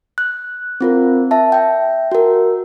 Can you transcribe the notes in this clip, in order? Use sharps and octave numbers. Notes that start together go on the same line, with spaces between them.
F#6
C4 F4 A#4
E5 A5
E5 G5
F#4 A#4